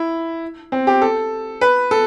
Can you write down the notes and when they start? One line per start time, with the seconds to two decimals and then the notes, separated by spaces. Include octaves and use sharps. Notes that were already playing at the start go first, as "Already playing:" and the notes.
Already playing: E4
0.72 C4
0.87 G4
1.02 A4
1.61 B4
1.91 A4